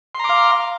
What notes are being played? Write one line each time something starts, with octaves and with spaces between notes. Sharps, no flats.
F5 A#5 C6 D6